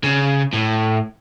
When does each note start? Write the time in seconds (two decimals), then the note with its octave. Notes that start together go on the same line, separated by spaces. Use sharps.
0.04 C#3
0.53 A2